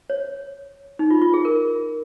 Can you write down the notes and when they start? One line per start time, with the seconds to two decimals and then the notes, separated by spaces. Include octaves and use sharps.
0.10 C#5
0.99 D#4
1.10 F4
1.22 F4
1.34 G#4
1.45 A#4